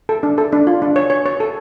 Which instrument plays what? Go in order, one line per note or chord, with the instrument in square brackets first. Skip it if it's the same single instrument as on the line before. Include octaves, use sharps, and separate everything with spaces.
[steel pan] A4
D4
A4
D4
F4
D4
C#5
C#5
C#5
A4